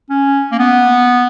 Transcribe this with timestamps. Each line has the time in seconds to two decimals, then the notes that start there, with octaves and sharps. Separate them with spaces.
0.10 C#4
0.52 A#3
0.59 B3